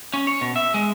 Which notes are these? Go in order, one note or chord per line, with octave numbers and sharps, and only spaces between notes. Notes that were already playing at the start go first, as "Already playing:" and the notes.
C#4
C#5
B2
E5
G#3